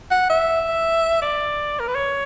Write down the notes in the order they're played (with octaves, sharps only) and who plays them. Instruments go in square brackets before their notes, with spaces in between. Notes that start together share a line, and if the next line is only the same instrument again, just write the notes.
[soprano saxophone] F#5
E5
D5
A#4
B4
C#5